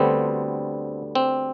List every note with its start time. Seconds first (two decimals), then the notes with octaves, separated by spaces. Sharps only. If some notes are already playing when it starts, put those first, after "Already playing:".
Already playing: D2 D3 G3 B3 C4
1.15 C4